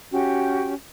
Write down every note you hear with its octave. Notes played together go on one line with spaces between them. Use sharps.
C#4 F#4 G4 G5